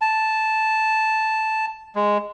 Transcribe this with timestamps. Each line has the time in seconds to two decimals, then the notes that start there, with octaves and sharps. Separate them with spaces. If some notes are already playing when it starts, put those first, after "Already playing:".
0.01 A5
1.95 G#3